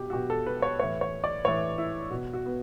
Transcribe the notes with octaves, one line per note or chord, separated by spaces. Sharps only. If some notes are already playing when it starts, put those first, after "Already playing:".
Already playing: B2 F#4 G4
F#4
B2 G4
A4
B4
C#5
A2 E3 C#5
C#5
D5
A2 E3 C#5
E4
B2 F#4
F#4
B3